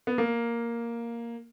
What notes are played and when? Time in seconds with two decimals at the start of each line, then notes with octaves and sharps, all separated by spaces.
0.07 B3
0.18 A#3